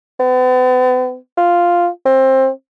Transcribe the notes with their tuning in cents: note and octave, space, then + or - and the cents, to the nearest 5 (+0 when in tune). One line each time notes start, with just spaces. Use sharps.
B3 +45
F4 +0
C4 +20